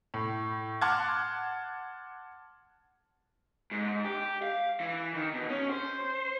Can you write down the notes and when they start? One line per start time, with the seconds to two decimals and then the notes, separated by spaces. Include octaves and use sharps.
0.14 A2
0.81 F#5 A5 C6 D6 F6 G#6
3.71 G#2
4.04 G4
4.42 F5
4.80 E3
5.15 D#3
5.34 B2
5.49 C#4
5.70 C5